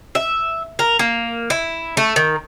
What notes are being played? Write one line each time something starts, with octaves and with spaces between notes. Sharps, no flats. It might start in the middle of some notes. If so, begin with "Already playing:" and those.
E5
A#4
A#3
E4
A3
D#3